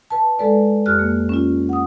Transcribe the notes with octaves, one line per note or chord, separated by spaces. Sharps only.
B4 A5
G#3 A4 B4 D5
F2 G4 F6 F#6
A#3
C#4 F4
F#5 D#6